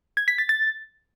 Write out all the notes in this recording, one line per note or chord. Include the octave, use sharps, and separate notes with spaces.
G#6
B6
A6
A6